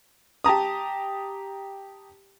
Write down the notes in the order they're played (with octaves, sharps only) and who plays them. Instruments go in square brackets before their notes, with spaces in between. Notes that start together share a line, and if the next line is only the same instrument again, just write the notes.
[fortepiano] G4 A5 A#5 D#6